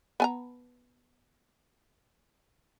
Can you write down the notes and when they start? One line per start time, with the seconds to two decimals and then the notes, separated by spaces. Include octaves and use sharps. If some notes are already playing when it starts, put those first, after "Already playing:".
0.20 B3 G#5 A#5